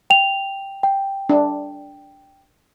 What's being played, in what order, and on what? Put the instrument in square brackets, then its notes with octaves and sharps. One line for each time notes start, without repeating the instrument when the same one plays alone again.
[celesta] G5 F7
G5
[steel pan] D4